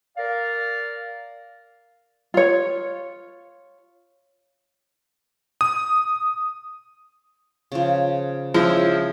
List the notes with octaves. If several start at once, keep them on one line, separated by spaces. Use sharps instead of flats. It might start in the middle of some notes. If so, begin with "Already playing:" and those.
A#4 D5 F5
F4 C#5
D#6
C#3 F3
C#3 F3 G#3 E4 C#6